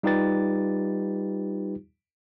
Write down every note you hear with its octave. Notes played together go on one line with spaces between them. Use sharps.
G3 D#4 F4 G4 B4 A6